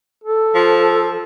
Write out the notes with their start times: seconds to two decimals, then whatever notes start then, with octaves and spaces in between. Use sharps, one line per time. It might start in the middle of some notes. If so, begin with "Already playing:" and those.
0.24 A4
0.55 F3